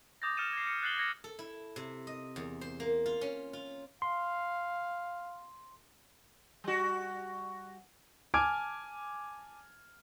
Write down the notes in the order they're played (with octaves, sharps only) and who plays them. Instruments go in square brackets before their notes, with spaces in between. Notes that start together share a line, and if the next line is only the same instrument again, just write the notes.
[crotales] D6 D#6 G6 A6 A#6
F6 A6 C#7 D#7 E7
G#6 C7
C#7
F#6 A6 C7 F#7 G7
G#6 A#6 C#7 E7
[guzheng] A4
E4
C3
D#5
E2
C5
A#3
F4
C#4
F4
[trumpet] F5 [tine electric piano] C6
[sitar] G3 F#4
[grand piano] G#5 A5 D6 F6 G#6 D7